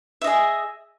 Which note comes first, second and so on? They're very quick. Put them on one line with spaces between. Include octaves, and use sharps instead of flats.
E5 D#5 G#4